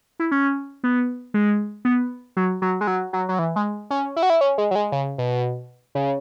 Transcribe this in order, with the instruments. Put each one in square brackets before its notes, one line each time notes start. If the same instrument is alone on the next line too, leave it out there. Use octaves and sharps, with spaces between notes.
[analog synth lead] E4
C#4
B3
G#3
B3
F#3
F#3
G#3
F#3
F#3
F#3
E3
G#3
C#4
E4
F#4
E4
C#4
G#3
F#3
G#3
C#3
B2
C#3